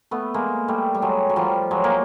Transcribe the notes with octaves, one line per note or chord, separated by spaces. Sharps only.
A3 B3
G#3 A#3
G3 A3
G3
F#3 G#3
F#3
F3 G3
F#3 G#3
A#3